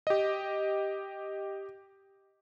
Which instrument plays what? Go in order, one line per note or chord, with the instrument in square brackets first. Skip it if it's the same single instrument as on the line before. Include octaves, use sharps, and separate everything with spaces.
[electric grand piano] G4 D#5